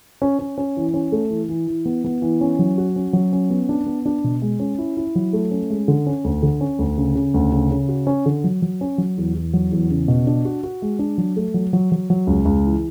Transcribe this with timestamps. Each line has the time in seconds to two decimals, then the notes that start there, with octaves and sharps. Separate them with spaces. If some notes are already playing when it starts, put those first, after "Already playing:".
0.22 C#4
0.39 C#4
0.58 C#4
0.77 E3
0.94 C#4
1.12 A3
1.30 E3
1.49 E3
1.67 E3
1.85 B3
2.04 B3
2.22 E3
2.41 C#4
2.59 F#3
2.78 F#4
2.96 C#4
3.13 F#3
3.33 C#4
3.50 B3
3.69 D4
3.86 B3
4.06 D4
4.24 B2
4.42 G#3
4.60 C#4
4.78 E4
4.97 E4
5.15 F#3
5.33 A3
5.51 C#4
5.70 G#3
5.88 D3
6.06 C#4
6.24 D2
6.43 D3
6.61 C#4
6.79 D2
6.98 C#3
7.15 C#3
7.34 D2
7.52 C#3
7.71 C#3
7.88 F#4
8.07 C#4
8.26 D3
8.44 F#3
8.62 F#3
8.81 C#4
8.98 F#3
9.17 E2
9.35 E2
9.53 F#3
9.72 E2
9.90 C#3
10.08 B2
10.27 D4
10.45 F#4
10.63 F#4
10.82 G#3
10.99 D4
11.18 F#3
11.36 A3
11.54 F#3
11.73 F#3
11.92 F#3
12.10 F#3
12.27 C#2
12.45 C#2
12.65 E3